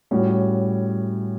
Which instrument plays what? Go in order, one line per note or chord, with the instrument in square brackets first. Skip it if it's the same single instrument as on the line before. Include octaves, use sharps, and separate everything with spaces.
[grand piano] A2 G3 C#4 F#4 C#5